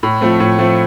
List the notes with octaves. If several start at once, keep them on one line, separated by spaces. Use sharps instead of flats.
A2
F3 A3 C4
A2
F3 A3 C4